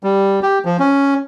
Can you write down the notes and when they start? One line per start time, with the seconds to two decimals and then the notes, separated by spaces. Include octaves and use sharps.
0.04 G3
0.43 G4
0.65 F3
0.79 C#4